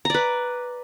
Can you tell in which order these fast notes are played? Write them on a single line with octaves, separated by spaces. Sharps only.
A#5 D5 B4